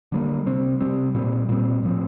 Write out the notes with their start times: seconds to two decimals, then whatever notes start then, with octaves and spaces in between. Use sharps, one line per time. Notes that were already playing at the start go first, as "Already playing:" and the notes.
0.12 D3 G3 A#3
0.46 C3 G3 C4
0.80 C3 G3 C4
1.15 A#2 G3 C4
1.49 A#2 G3 C4
1.83 A2 F3 C4